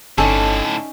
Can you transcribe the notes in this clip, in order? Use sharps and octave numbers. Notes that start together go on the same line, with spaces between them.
G1 A2 D3 C#4 D#4 A4 D5